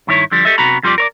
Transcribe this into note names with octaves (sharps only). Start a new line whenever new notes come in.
G2 D#3 E4 G#4 C#5
D3 F3 G3
G4 A4 D#5 E5
C3 B3 F#4 A#5 B5
F2 G3 F4 G4 G#4 D5
A#4 C#5 D5